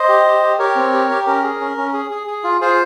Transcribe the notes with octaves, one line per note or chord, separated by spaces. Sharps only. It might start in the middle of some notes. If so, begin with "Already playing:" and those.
Already playing: C5 D#5
G4
G4
G4
G4 A#4 C#5
C4
G4
G4
C#4 A#4
G#4
C#4
C#4
G#4
G#4
G#4
F4
F4 G#4 C5